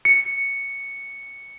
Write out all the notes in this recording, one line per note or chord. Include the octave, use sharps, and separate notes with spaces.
C#7